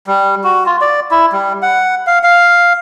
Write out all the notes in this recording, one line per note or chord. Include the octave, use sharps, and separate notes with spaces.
G3
F#4
F4
D5
E4
G3
F#5
F5
F5